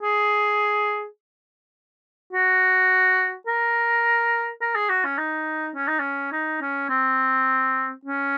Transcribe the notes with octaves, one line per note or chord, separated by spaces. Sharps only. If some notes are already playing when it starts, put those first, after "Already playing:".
G#4
F#4
A#4
A#4
G#4
F#4
C#4
D#4
C#4
D#4
C#4
D#4
C#4
C4
C#4